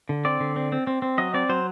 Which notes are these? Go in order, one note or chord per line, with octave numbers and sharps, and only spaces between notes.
D3
C4 D5
D3
C4
C4
C4
C4
F#3 D#5
C4 D5
F#3 C5